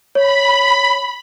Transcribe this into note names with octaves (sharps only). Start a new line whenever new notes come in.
C#5 B5